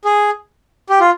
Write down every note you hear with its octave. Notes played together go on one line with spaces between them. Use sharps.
G#4
G4
F4